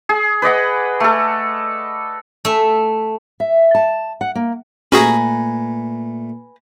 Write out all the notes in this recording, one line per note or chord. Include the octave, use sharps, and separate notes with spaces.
G#4
B4 D5 D#5 F#5
A3 A4
A3 E5
E5
A5
F#5
A#3
A#2 A3 C#4 F#4 G#4 B4 G#5 A#5